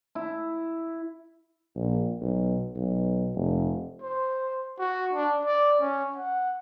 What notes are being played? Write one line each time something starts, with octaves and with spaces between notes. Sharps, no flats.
E4
A#1
B1
B1
F1
C5
F#4
D4
D5
C#4
F#5